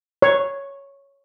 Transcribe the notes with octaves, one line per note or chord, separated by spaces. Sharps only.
C#5